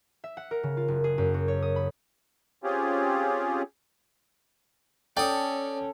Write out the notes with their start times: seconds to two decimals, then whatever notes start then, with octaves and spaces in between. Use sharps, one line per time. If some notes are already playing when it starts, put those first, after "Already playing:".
0.24 E5
0.37 F#5
0.51 A#4
0.63 C#3
0.77 F4
0.88 F#1
1.04 G#4
1.18 F#2
1.34 F#4
1.48 C#5
1.62 D#6
1.76 B5
2.64 C4 C#4 F4 G4 G#4
5.17 C#4 A4 D5 G5 D#6